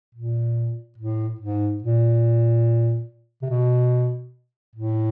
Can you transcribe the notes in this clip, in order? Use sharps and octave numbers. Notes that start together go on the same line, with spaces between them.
A#2
A2
G#2
A#2
C3
B2
A2